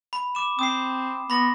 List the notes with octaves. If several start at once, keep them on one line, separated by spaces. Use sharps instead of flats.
B5
D6 E7
C4 D#6 C7
B3 B5 C6 A#6